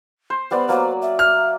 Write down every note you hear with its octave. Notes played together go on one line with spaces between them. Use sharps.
C5
G3 B3 C5 D5
F#3 A#3 C5
E5
F6